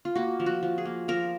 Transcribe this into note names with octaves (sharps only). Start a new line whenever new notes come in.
F4
A#3 F#4
F3
F#4
F3
G#4
A#3
F3 A#4